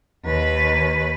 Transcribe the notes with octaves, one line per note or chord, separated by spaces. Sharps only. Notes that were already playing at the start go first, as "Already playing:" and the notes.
D#2 B4